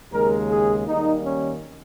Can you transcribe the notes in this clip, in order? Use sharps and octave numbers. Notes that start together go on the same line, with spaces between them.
D#2 C#3 G#3 A#4
G#4
D#2 D#3 G3 A#3 D#4
C#4